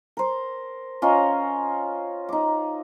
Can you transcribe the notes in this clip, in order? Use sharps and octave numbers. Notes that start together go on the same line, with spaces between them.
A#4 C5
C#4 F4 D#5 A#5
D#4 D6